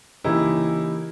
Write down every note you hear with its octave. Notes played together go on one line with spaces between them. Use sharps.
C#3 E3 A#3 D#4 E4 G4